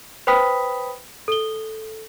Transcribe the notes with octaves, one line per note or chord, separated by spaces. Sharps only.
B4 C5 G5 B5 D#6 B6
A4 G7